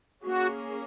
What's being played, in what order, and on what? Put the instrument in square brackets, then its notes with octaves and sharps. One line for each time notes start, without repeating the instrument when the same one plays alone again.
[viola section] A#3 C#4 G#4 [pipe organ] F#4